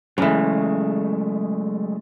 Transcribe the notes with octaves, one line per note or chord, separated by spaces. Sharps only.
C#3 E3 F#3 G#3 A3